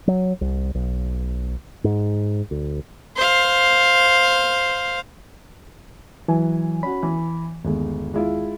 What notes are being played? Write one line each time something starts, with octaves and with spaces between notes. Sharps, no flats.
F#3
C2
B1
G#2
D2
C5 F5
E3 F#3 G#5
C#4 F#4 B5
E3
G1 D#2 G#3
G#3 E4 F4